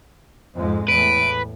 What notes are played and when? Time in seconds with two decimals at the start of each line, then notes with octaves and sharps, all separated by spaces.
0.56 F2 G#2 G#3
0.88 E2 A2 B4 D7